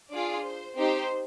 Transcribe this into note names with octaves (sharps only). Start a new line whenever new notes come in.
D4 F4 G#4 D5
C5
C4 D#4 G4 C5